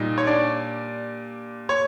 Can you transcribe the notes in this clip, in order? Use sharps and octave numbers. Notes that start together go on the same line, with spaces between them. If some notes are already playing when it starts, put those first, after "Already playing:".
Already playing: A#2 G3 D#4
C#5
D4 D5
C#5